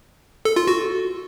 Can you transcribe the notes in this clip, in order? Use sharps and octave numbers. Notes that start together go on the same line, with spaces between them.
A4
F4
F#4